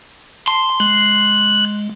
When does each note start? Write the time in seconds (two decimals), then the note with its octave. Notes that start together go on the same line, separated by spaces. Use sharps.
0.48 A5 C6
0.80 G#3 F#6